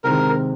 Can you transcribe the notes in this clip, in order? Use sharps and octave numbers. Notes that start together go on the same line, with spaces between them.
C3 D#3 G#3 C4 A#4